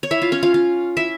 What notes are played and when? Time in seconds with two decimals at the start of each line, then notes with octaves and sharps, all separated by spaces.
0.03 C#5
0.11 E4 E5
0.21 F4 F5
0.32 C#4 C#5
0.43 F4 F5
0.54 F4 F5
0.97 E4 E5